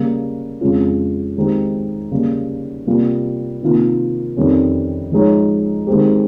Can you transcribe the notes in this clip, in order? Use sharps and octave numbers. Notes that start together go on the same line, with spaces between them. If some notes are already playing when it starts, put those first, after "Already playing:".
Already playing: C#3 G3 A#3
F2 C#3 G#3 C#4 F4
D#3 G#3 C4 D#4 G4
C#3 G3 A#3
C3 G3 A#3 F4
C3 D#3 A#3 F4
F2 D#3 G3 C#4
F3 G#3 D#4 G#4 C#5
D#3 G#3 C4 G4